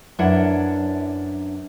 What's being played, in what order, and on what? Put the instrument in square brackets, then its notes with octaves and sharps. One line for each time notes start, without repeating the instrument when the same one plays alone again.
[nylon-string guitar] F#2 D4 E4 B4 F#5